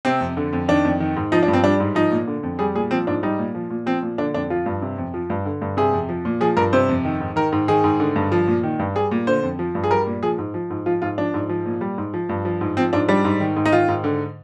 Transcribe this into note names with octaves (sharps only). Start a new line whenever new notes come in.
C3 C4
F2
D3
F2
D#3 D4
F2
D#3
G#2
F3 D#4
D4
G2
C4
G3 D4
G#2
F3 D#4
A#2
D3
F2
G3 G#4
A#2 G#4
F3 C4
G#2 D4
G3 D#4
A#2
F3
A#2
F3 C4
A#2
D3 D4
F2 D4
F3 F4
G2
C3
F2
F3
G2
D3
G2
C3 G#4
F2
F3
A#2
F3 G#4
G2 A#4
C3 C5
F2
D#3
G#2
D#3 A#4
G#2
D#3 G#4
G#2
D3
G2
F3
A#2
D#3
G2
G3 G#4
A#2
D3 C5
F2
F3
G2
G#4
G3 A#4
A#2
F3 G#4
G#2
F3
G#2
F3 F4
G#2 F4
F3 D4
G#2
F3
A#2
G3
G#2
F3
G2
F3
G#2
F3 C4
G#2 D4
G3 D4
G#2
D#3
G#2
D#4
D#3 F4
G#2
D3